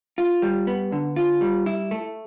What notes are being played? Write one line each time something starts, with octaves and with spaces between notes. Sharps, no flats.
F4
G3
B3
D3
F4
G3
E4
A3